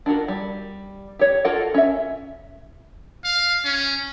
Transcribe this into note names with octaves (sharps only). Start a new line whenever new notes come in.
D4 F4 F#4 A#4
G3
G4 C#5
F4 F#4 A4 A#4 F#5
C#4 E5
F5
C#4